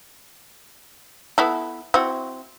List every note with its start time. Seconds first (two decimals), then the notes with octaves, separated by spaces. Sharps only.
1.38 B3 E4 A4
1.94 C4 E4 F#4